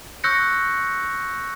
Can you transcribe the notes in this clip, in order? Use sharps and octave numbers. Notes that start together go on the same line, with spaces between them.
C#6 E6 F#6 G6 A#6 C#7